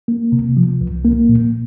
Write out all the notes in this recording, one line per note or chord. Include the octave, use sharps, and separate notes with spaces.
A#3
C3
F3
C2
A#3
A#2